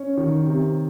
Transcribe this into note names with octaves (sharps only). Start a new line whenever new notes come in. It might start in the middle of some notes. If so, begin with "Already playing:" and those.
Already playing: C#4
D#3
C3